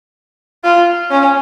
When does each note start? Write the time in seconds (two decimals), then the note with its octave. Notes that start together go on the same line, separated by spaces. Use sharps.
0.64 F4
1.10 C#4